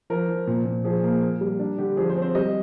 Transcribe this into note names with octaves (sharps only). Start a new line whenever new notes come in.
F3 A#4
F3
A#2
A#2
F3 G#4
A#3
A#3
G3
D4
D3 G4
F3 G#4
C5
C4
C5
G3 D#5